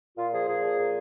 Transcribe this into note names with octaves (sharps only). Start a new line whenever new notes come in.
A#2 F4
F3 G#4
A#2 G#4
F3
A#2